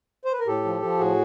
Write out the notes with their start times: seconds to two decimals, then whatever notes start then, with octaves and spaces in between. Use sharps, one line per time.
0.25 C5
0.33 B4
0.40 A#4
0.47 A2 G4 A4
0.65 F3
0.82 F3
0.99 A2 F#4 G#4